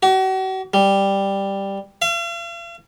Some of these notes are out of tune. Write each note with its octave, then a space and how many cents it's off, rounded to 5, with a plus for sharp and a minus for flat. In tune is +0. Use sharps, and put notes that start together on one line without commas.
F#4 +40
G3 +5
F5 -45